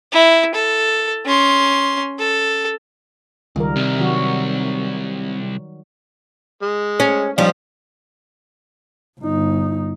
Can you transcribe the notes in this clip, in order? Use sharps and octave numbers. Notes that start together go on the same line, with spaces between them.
E4
A4
C#4 C6
A4
C#2 D#3 G3 A#4
C2 C3
D#3 F#3 F#4
G#3
C#4
F3 G3 C#4 D#4 F5
G1 D#4